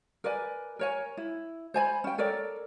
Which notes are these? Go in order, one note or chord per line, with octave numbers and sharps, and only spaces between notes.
A#4 B4 D5 G#5
A#4 C#5 G#5
E4
C5 G#5 A5 B5
C#4 G5
A4 A#4 C#5 D5